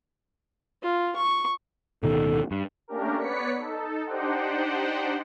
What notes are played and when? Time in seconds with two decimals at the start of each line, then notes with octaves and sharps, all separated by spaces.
0.83 F4
1.16 C#6
2.03 D1 B2 D#3 A4
2.51 G2
2.88 A3 A#3 C#4 D4 G4 A#4
3.19 B3 B4 C#5 D5 B6 C#7
3.57 D#4 A4
4.05 D4 D#4 G4 C5 F#5 G5